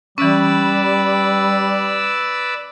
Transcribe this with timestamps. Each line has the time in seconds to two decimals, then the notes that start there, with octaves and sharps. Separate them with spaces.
0.18 E3 G3 C#4 B4 D5 E6